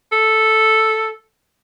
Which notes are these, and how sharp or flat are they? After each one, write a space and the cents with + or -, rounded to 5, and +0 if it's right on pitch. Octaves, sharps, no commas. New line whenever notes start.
A4 +0